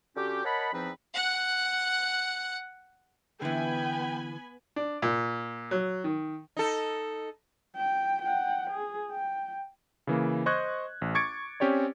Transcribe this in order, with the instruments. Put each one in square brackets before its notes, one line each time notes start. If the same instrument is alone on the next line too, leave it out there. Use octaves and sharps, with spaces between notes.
[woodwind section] D3 C#4 F#4 G4
A#4 C#5 D#5 F#5 A5 B5
E2 F3 C4 D#4 B4
[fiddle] F#5 F#6
[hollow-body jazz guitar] D3 E3 [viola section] B3 G#5 B5 [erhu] G5
[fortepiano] D4
A#2
F#3
D#3
[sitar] D#4 A4
[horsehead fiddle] G5
F#5 G5
G#4
G5
[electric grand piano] C#3 E3 A#3
C5 D#5 C#6 F#6 G#6
A1
C#6 D6 G#6 A6 C#7 D7
C4 C#4 G4 C#5 D5